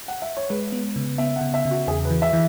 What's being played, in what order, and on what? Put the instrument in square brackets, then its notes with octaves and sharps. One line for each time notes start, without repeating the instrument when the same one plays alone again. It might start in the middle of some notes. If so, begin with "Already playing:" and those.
[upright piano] F#5
E5
C#5
[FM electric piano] G#3 [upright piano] B4
[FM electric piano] B3
C#3
[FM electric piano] B3 [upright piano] E5
[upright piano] F#5
[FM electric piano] C#3
[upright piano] E5
[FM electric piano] C#3
[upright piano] F#4
[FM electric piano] E2 [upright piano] G#4
[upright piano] B4
[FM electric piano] E3
[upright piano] E5
[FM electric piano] E3